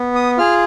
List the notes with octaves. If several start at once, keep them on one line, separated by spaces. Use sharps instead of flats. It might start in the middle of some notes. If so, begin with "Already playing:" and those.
Already playing: B3
D#6
F4 G#4 F6